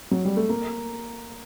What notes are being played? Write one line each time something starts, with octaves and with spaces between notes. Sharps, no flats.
F#3
G3
A3
A#3